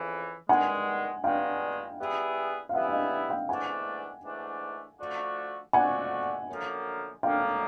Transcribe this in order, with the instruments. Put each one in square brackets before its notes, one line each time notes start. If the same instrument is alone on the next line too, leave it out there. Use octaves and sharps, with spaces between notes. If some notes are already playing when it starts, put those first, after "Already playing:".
Already playing: [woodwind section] F2 C#3 E3
[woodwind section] G2 D#3 G#3 [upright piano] F#5 G#5
[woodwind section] G2 D#3 G#3 [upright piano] F5 G5
[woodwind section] E3 G3 B3 E4 G#4
[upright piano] F5
[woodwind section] E3 G3 B3 E4 G#4 [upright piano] E5 F#5
[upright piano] E5
D#5 F5
F5 G5
[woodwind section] G#2 E3 A3 D4 [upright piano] F#5 G#5
[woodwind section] G#2 E3 A3 D4
D3 F3 A3 D4 F#4
[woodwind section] D3 F3 A3 D4 F#4 [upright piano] F#5 G#5
[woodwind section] F#2 D3 F3 A#3
[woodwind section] F#2 D3 F3 A#3 [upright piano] F5 G5